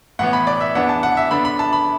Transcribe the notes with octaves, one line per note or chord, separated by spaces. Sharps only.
A2 E3 B3 F#5
B5
D5
E5
E2 E3 B3 D4 F#5
A5
F#5
E5
D3 B3 D4 B5
B5
A5
B5